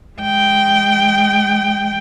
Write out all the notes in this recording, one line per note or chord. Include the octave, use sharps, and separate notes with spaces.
G#3 G5